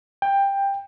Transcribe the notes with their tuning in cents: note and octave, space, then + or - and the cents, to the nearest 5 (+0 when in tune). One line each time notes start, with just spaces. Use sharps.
G5 +15